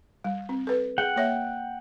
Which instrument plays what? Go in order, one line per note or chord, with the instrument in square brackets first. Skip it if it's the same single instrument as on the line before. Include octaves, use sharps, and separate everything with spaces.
[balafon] G3
C4
A4 B4
[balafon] G#4 [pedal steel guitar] F#5 G5
[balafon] A#3 C#5 E5